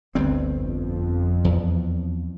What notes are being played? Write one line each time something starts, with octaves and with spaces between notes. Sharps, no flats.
G1 D2 G2 C4
F2
E2